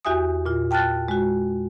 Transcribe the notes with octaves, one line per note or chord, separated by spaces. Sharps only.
E2 F#4 G4 E5 G#5 D#6
A#2 F4
G5 A5 F6 F#6 A6
G#3 F#4